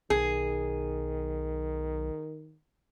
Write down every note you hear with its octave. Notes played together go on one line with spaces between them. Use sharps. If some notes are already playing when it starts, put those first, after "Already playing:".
B1 D#3 G#4